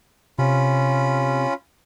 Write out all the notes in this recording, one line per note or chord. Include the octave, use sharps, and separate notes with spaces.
C3 C#4 F4 B5